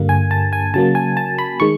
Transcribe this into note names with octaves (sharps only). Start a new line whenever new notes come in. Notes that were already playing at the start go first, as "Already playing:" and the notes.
Already playing: G2 D3 G3 A#3
G#5
A5
G#5
C#3 F#3 A#3 A5
G#5
A5
B5
D#3 G#3 C#6